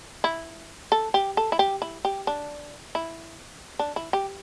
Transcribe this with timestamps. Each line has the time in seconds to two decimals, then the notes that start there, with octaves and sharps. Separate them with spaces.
0.24 E4
0.92 A4
1.14 G4
1.37 A4
1.52 E4
1.59 G4
1.82 E4
2.05 G4
2.27 D4
2.95 E4
3.79 D4
3.96 E4
4.13 G4